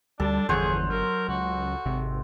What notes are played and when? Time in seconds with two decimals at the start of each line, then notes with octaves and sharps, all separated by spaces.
0.20 D2 G3 D4 A4
0.49 G1 E2 D3 F3 G#4 C5 C#5 F#5
0.90 F#3 A#4
1.28 C#2 F#4
1.86 G#1 C3